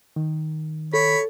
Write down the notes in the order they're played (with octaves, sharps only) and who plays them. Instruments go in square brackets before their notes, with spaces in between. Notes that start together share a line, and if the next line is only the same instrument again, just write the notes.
[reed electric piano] D#3
[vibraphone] A4 [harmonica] C#5 [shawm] B5